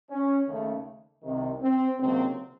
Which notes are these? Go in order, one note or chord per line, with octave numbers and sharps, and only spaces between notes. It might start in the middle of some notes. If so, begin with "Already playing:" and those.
C#4
D#2 C#3 A3
C2 C3 D#3
C4
C#2 C3 D#3 F#3 A#3 C4